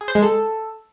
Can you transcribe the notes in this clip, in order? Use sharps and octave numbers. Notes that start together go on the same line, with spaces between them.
G#4
C5
G#3
A4